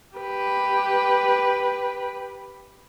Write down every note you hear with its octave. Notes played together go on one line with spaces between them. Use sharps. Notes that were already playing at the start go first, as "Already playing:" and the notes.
G4 B4